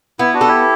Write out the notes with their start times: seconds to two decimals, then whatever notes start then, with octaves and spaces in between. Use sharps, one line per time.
0.19 B3 E4
0.34 D4 F#4
0.41 A4
0.48 E4 G4